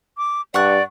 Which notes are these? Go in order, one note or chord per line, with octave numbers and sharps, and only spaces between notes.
D6
G2 D5 F#5 C#6 F#6